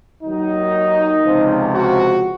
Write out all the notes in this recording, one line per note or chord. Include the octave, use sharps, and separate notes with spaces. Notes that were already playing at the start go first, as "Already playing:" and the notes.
D#2 D#3 F#3 D#4
C#2 C3 F3
F#4